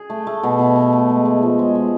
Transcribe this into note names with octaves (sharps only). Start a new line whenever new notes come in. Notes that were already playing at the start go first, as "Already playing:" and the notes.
Already playing: G#4
A3
A3
B2
B2
B2
A3
G#3
G#3
F3
G#3
G#3